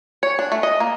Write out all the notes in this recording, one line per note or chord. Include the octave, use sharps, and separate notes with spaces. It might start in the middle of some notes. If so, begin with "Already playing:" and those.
C#5
D4
A3
D#5
A#3